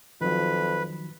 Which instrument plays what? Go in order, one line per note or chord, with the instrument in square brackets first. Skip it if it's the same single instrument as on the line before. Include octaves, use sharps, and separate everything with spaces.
[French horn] F2 [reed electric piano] D#3 F3 F#3 [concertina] B4